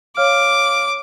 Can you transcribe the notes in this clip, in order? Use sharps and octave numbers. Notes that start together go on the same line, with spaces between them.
C#5 F5 D6 F6